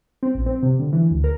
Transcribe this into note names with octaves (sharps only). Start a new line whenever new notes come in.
C4
A#1
C4
C3
D3
E3
D2
A#4